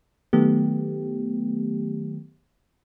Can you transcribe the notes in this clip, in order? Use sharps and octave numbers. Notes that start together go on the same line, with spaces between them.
D#3 F#3 A3 B3 G4